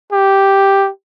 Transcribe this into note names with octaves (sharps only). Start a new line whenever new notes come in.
G4